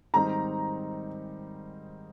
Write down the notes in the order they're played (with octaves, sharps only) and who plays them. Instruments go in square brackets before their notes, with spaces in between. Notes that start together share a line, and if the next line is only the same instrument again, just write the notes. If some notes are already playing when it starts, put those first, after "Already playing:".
[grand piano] G#2 D#3 G3 C4 D#4 [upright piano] A#5